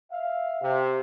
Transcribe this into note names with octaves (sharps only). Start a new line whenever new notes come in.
E5 F5
C3